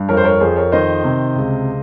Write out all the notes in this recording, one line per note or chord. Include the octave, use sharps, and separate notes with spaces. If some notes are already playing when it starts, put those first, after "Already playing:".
Already playing: G2
F2 A#4 C#5
C5
A#4 C#5
F2 G#4 C5
A#4 C#5
D#3 C5 D#5
C3
C#2